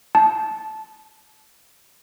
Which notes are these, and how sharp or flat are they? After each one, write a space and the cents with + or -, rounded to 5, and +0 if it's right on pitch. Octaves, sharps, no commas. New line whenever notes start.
A5 -15